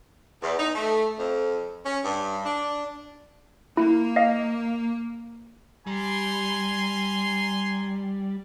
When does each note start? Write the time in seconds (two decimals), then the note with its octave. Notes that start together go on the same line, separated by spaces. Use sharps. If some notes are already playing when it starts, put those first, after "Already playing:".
0.42 E2
0.59 D#4
0.75 A3
1.19 F2
1.86 C#4
2.04 G2
2.45 D4
3.77 A#3 E4
4.16 D#5 F5
5.87 G3 G#5 A#5 C6